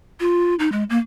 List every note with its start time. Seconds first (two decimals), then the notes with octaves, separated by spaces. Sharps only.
0.20 F4
0.59 D#4
0.72 G#3
0.90 A#3